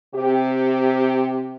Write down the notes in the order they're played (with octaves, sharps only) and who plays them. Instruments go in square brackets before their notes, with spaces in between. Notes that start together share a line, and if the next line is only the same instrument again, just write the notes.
[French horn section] C3 G4